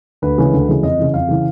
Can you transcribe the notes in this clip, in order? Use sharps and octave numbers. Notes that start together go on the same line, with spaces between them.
D2 B4
C#3 E3 G#3
D2
C#3 E3 G#3
F2 D#5
C#3 E3
F2 F5
C#3 E3